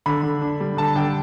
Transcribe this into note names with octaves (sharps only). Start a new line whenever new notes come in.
D3 B5
D3
D4
G3
D3 A5
D3 G5